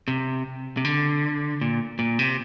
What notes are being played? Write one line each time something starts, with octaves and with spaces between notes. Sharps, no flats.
C3
C3
D3
A#2
A#2
C3